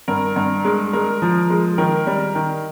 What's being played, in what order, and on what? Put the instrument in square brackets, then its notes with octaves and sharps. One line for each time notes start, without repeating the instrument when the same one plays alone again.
[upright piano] G2 A#4
G2
G#3
G#3 A#4
F3
G#3
D#3 A#4
G3
D#3